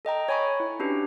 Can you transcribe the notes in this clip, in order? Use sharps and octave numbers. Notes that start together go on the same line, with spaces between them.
A4 D#5 G5 A#5
C#5 G#5 B5 C#6
E4
C#4 D4 F#4 G4 B4